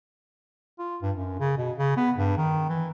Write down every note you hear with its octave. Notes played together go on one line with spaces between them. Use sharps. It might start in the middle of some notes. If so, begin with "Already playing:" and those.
F4
G2
F#2
C#3
B2
C#3
B3
G2
D#3
E3